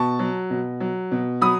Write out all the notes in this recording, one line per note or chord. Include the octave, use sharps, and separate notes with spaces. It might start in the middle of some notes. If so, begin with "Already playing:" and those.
Already playing: B2 A5 C#6
F#3
B2
F#3
B2
F#3 B5 D#6